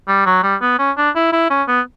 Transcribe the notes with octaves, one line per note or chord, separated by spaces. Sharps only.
G3
F#3
G3
B3
C#4
D4
E4
E4
C#4
B3